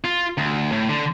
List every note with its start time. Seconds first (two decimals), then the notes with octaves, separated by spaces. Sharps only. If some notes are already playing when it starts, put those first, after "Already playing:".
0.04 F4
0.37 D2
0.72 A2
0.89 D3